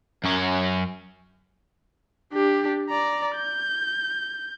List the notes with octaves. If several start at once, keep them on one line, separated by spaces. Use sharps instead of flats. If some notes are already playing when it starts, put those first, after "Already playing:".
F#2 C#4
D4 G4
D5 A#5
G6